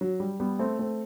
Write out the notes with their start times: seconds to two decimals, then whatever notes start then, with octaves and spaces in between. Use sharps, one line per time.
0.01 F#3
0.20 G3
0.40 G3 B3
0.59 A3 C4
0.79 A3 C4